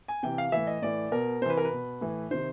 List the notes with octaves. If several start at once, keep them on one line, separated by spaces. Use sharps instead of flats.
G#5
C3 E3 G5
F5
A2 E3 E5
D#5
A2 E3 D5
B2 A#4
C3 E3 B4 C5
A#4
B4
B2
A2 E3
C3 D#3 C5